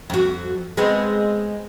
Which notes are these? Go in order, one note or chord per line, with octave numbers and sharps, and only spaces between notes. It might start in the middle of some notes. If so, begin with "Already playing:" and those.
F2 F#4
G#3 B3 C4